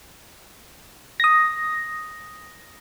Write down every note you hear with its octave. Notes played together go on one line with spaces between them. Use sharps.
D#6 A#6